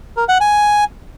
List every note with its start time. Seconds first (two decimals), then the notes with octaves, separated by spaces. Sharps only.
0.17 A#4
0.29 F#5
0.41 G#5